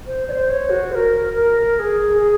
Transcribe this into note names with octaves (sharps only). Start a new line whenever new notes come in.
C5
D5
C5
C#5
F#4
C5
A#4
A#4
A#4
G#4
G#4